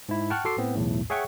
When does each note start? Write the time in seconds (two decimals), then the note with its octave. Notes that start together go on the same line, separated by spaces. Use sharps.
0.09 G#2 E4
0.30 F#5 G5 A5 C#6 F6 F#6
0.45 F#4 A4 C6 D6 C7
0.58 A2 B3 C4
0.75 B1 E2 A2
1.10 G#4 C#5 E5 F#5 G5 C#6